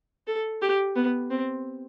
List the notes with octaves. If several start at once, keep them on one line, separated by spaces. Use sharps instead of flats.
A4
G4
B3
C4